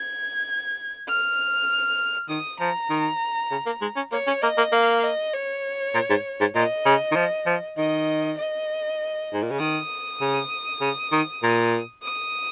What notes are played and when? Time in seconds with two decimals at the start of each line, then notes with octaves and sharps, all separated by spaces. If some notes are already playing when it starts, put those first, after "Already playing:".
Already playing: G#6
1.08 F6
2.29 D#3 D#6
2.60 F3 A#5
2.90 D#3
3.51 C#3
3.66 A#3
3.82 G#3
3.96 C#4
4.12 A#3 C#5
4.27 C#4
4.42 A#3 D#5
4.58 A#3
4.72 A#3 F5
5.03 D#5
5.33 C#5
5.94 A#2
6.10 G#2
6.40 G#2
6.55 A#2 D#5
6.85 C#3
7.11 D#3
7.16 F3
7.46 F3
7.77 D#3 D#5
8.38 D#5
9.34 G#2
9.43 A#2
9.51 C#3
9.60 D#3 D#6
10.21 C#3
10.81 C#3
11.12 D#3
11.43 A#2
12.02 D#6